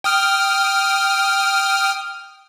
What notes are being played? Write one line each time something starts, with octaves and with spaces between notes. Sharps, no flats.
G5 D#6 F6